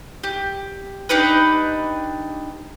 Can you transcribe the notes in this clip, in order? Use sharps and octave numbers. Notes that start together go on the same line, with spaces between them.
G4
D4 D#4 G4 B4